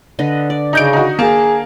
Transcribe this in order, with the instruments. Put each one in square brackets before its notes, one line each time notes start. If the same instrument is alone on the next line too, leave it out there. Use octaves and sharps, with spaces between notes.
[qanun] D3 B4 D#5
D5
[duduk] C#3 [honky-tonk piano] D#4 G6 D7
[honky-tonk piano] D#4 F#4
[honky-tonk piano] A#3 [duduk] G#4 [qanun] A5